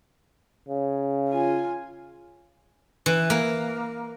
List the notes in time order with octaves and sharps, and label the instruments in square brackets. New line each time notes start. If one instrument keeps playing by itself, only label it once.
[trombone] C#3
[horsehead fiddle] F4 G#5
[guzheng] E3
A#3